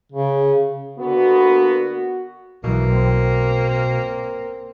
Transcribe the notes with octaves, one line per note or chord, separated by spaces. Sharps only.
C#3
D3 A#3 B3 F#4
B1 B2 E3 A#3
C4